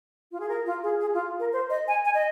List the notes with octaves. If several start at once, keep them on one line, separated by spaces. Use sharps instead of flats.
F4
G#4
A#4
F4
G#4
G#4
F4
A#4
C5
D#5
G#5
G#5
D#5